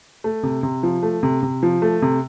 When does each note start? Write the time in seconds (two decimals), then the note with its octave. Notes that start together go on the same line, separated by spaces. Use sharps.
0.24 A3
0.43 C3
0.63 C3
0.83 F3
1.03 A3
1.23 C3
1.43 C3
1.63 F3
1.82 A3
2.02 C3